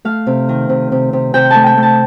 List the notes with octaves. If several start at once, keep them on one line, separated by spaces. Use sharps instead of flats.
A3 F5
C3
D#3
C3
C3
C3
C3 G5
A3 A5
G5
A3
A5